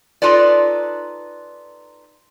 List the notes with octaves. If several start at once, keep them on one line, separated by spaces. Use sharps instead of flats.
D#4 F4 A4 B4 D5